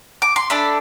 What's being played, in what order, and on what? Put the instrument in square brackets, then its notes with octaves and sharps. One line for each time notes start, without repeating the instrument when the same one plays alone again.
[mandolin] D6
C6
A3 D4 A4 B5